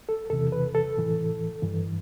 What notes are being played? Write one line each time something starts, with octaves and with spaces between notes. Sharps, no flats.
A4
E2 C3 E3 A4
B4
A4
A2 E3
G2 E3